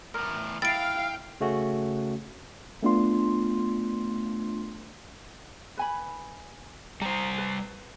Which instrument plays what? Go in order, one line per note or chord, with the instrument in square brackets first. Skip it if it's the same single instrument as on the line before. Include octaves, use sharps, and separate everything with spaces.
[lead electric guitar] E2 A2 [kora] A#4
[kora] E4 [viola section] F5 [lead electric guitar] G5 [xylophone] A6 D7
[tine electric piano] C#3 A3 C#4 F#4
[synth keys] A3 B3 D4 F4 C6
[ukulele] B4 G#5 B5
[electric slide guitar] G3 C5 [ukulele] A#5
[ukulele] B4